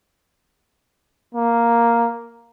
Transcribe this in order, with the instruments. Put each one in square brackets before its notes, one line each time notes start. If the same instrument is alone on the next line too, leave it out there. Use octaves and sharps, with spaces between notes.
[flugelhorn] A#3